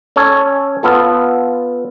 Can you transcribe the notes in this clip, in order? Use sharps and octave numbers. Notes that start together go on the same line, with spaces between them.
C#4 A4 C#5
B3 F4 A4